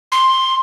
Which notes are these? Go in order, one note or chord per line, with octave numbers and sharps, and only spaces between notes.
C6